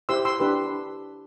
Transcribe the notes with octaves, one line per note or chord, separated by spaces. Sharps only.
E4 G4 C5 C6 E6
C6 E6
D4 G4 B4